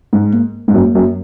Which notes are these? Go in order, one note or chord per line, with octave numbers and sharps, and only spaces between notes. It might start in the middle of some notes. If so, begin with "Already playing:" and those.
G#2
A#3
G#2
F#2 A#3
F#2